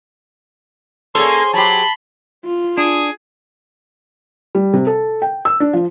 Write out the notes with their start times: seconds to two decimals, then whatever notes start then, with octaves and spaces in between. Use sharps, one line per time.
1.15 A#3 C#4 G#4 A4 C5 C#5 C6
1.53 F#3 G4 A5 B5 C6
2.45 F4
2.78 D4 G#4
4.55 G3
4.73 C3
4.87 A4
5.22 G5
5.45 E6
5.60 D4
5.73 F3